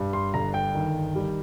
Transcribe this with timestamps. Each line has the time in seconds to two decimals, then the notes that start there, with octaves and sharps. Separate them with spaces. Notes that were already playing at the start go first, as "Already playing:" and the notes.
Already playing: G2 G3
0.13 C6
0.34 G1 A#5
0.54 G5
0.75 D#3
1.15 G3